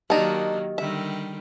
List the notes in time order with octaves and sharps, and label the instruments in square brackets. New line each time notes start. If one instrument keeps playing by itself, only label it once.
[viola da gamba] D#3 F#3 A#3 [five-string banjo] D4 D#4 [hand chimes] G4 D#5
[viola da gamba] D3 D#3 G3 [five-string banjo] E5